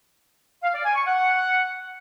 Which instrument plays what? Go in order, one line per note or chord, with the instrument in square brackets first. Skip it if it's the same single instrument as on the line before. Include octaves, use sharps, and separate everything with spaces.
[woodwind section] F5
D5
G#5
C#6
F#5